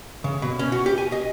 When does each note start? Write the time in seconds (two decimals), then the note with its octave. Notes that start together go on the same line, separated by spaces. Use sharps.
0.24 C#3
0.42 B2
0.59 C#4
0.72 F#4
0.86 G4
0.98 G#5
1.12 D#5